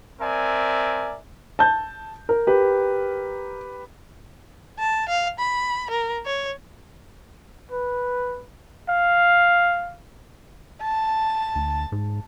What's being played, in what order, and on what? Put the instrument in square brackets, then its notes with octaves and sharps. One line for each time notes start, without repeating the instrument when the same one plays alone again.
[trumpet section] C4 A#4 D5 E5 G#5
[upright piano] A5 G6
A#4
[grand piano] G4 B4
[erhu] A5
F5
B5
A#4
C#5
[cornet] B4
F5
[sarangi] A5
[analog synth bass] D2
G#2